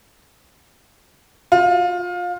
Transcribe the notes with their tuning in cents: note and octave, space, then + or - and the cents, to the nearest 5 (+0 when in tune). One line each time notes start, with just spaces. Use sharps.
F4 +25